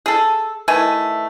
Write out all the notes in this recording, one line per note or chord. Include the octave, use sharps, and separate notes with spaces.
G#4 A4
D#3 E3 A3 G#5